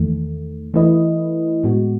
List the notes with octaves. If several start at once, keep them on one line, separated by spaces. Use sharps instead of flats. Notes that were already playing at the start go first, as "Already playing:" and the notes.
Already playing: E2 D#3 A3
E3 A3 E4 B4 D#5
A2 G#3 B3 F#4